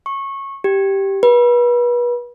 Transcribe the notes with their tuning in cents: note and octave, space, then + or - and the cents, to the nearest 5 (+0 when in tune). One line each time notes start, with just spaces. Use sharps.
C#6 -20
G4 -5
B4 -35